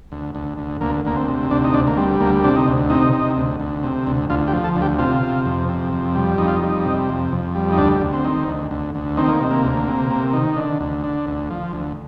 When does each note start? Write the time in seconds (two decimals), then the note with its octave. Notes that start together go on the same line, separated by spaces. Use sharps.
0.12 D2
0.35 D2
0.58 D2
0.81 D2 A#3
1.05 D2 A#3
1.16 C4
1.28 C3
1.51 D2 D4
1.64 D#4
1.74 D2 D4
1.87 A#3
1.97 G3 C4
2.21 D2 A#3
2.44 C3 D4
2.56 D#4
2.68 D2
2.90 C3 D#4
3.13 C3
3.37 D2
3.60 D2
3.83 C3
4.07 D2
4.30 D2 F4
4.47 G4
4.53 F3
4.64 A4
4.76 D2
4.82 G4
4.99 C3 F4
5.22 C3
5.45 F2
5.69 C3
5.93 F2
6.15 G3
6.38 F2 D#4
6.47 F4
6.56 D#4
6.63 G3
6.85 C3
7.09 F2
7.32 F2
7.55 G3
7.72 D#4
7.78 D2 D4
8.01 D2
8.13 C4
8.25 D#3
8.48 D2
8.71 D2
8.95 D2
9.17 D#3 C4
9.29 A#3
9.41 C3
9.51 A#3
9.64 D2
9.87 C3
10.11 C3
10.33 D#3
10.56 D3
10.81 D2
11.04 D3
11.27 D2
11.50 F3
11.73 D2